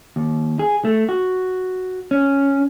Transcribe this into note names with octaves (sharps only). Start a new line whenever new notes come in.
D#2
G#4
A3
F#4
C#4